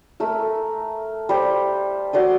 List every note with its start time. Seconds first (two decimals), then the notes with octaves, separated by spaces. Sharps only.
0.20 A3 A#4 E6
1.29 G3 C5
2.13 F#4 D5 C6 D#6